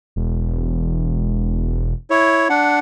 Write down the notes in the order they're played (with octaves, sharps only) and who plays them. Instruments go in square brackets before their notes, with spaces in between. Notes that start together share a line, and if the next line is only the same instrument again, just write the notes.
[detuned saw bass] E1
[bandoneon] E4 C#5
D4 F#5